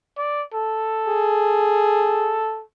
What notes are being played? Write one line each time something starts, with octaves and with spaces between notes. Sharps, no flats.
D5
A4
G#4